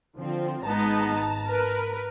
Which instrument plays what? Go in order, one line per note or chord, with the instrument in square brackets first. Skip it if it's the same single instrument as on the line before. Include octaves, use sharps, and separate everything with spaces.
[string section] D3 F3 C4
[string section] G#1 A5 A#5 [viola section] G#3 B3 D#4
[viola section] A#4 B4